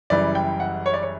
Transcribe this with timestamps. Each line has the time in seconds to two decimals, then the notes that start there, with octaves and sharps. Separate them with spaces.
0.10 F#1 F#2 E3 G3 D5
0.35 G5
0.60 F#5
0.86 C#5
0.94 D5
1.02 C#5